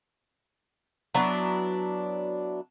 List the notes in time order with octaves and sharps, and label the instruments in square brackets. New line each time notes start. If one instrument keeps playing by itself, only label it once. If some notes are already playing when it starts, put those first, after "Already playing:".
[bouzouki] F#3 B3 D4 E4